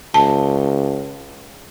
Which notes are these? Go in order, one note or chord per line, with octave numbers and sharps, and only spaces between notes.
C#2 A5